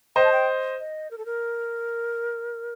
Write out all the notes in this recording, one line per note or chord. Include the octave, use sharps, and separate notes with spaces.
C5 D#5 G5
A5
G5
D#5
A#4
A4
A#4